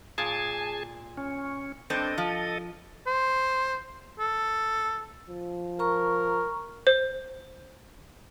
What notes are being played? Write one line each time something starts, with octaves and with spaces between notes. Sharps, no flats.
A#2 G#4 G#5 A5
C#4
G2 C4 D4 A4 D#5
F3
C5
A4
F3
A#4 A#5 C#6
C5